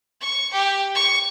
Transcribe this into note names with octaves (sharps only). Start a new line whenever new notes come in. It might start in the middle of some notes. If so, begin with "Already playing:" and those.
C#6
G4
C#6